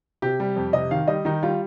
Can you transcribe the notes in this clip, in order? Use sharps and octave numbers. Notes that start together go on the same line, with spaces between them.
C3 G4
G3
F2
C3 D#5
D#3 F5
G3 D#5
D#3 D#4
G3 F4